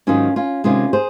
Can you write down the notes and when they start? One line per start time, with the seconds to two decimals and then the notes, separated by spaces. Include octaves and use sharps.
0.07 G#2 D#3 F#3 C#4 F4
0.36 C#4 F4
0.64 C3 D#3 G#3 C#4 F4
0.93 G#4 C5